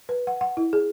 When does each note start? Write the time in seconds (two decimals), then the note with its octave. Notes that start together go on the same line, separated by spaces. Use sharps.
0.09 B4
0.27 F#5
0.41 F#5
0.57 E4
0.73 G#4